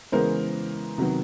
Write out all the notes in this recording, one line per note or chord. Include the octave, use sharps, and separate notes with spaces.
C#3 E3 G#3 B3 A#4 C5
C3 D#3 F#3 B3